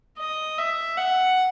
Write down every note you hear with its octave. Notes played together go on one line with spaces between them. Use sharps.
D#5
E5
F#5